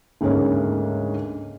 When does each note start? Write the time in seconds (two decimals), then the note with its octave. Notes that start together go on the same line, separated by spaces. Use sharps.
0.21 D2 G#2 C#3 G#3 A#3 C#4